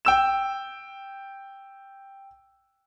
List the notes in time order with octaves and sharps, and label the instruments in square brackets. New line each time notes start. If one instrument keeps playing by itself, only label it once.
[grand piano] G5 E6 E7